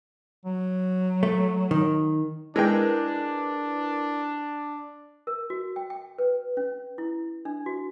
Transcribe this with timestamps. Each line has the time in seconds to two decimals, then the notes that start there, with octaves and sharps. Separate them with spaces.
0.45 F#3
1.23 A3
1.71 D#3
2.56 G#3 D4 E4 A#4 B4 G5
5.27 A#4
5.50 F#4
5.76 G5
5.90 G5
6.18 B4
6.57 C#4
6.98 E4
7.45 D4
7.66 F#4